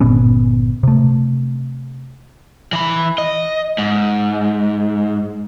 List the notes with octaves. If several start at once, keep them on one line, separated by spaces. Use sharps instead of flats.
G1 A#2 B3 C#4
C3 A3
E3 B5
D#5
G#2